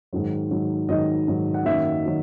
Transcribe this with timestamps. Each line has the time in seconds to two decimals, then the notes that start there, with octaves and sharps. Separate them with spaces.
0.13 G#2 D#3 F#3
0.51 G#2 D#3 F#3
0.89 G#2 D#3 F#3 D#5
1.28 G#2 D#3 F#3
1.54 F#5
1.65 F#2 D#3 F#3 A#3 E5
2.06 D#3 F#3